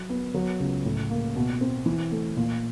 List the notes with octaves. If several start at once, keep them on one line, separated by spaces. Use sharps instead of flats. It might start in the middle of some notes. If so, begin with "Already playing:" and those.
Already playing: F#3
B3
F#3
C#2
A2
A#3
B2
C4
E3
A3
A#2